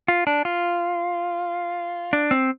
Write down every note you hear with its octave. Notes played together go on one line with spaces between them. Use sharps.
F4
D4
F4
D4
C4